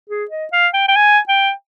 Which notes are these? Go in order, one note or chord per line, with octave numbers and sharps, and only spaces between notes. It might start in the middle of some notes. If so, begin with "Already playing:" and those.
G#4
D#5
F5
G5
G5
G#5
G5